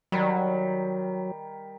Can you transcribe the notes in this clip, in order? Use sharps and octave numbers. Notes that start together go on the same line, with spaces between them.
D#3 F#3 G3